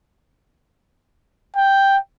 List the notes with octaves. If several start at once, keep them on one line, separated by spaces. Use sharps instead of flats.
G5